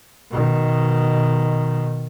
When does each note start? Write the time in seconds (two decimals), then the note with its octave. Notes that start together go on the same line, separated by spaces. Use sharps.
0.30 B2 D#3